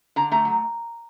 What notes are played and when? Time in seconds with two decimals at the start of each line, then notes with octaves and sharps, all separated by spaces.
0.16 D3 A#5
0.31 A3 A#5
0.45 F#3